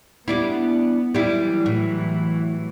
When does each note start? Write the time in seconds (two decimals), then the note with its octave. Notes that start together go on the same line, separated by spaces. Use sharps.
0.28 G3 B3 D4 E4
1.14 E3 F#3 G3 E4
1.66 A2